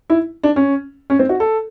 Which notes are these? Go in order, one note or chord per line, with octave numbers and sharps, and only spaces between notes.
E4
D4
C#4
C#4
C4
F#4
A4